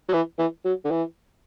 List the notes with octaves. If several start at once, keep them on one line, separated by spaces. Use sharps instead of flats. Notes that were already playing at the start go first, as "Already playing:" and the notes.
F#3
E3
E3
F#3
D3
E3